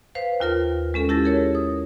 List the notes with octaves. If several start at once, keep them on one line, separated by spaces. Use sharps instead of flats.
B4 C5 F5
D#2 F4 A#4 F6
G#3 C#4 A4
E4 G4 A5 A6 A#6
G#4 A#4 C#5
D#6